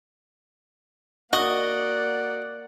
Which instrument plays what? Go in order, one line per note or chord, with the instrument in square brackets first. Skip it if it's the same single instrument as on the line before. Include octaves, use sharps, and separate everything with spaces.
[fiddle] A#3 D5 [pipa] F#4 [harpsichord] D#5 [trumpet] F#5